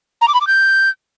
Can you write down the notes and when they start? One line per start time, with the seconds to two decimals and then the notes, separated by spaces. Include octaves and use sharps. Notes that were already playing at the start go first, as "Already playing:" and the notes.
0.21 A#5
0.28 D6
0.34 B5
0.41 D6
0.47 G6